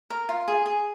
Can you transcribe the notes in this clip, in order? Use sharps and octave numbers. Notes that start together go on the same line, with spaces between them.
A#4
F4
G#4
G#4